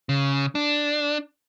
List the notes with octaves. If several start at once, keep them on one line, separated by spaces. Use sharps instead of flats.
C#3
D4